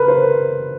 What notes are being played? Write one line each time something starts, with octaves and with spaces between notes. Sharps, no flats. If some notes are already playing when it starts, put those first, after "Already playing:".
Already playing: A#4 B4
C5